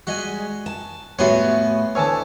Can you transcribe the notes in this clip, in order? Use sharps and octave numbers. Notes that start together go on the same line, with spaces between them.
G3 G#3 F#4 D#5 G#5
A5
A2 A3 B3 F#4 C#5 G#5 C6
D2 E3 C#5 G#5 A5